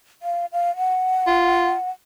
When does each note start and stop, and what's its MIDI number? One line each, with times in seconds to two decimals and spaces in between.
0.22 0.46 77
0.53 0.75 77
0.77 1.90 78
1.27 1.74 65